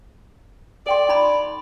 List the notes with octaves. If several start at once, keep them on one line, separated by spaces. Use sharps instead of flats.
A4 D5 G5 C6
D#4 A#5 B5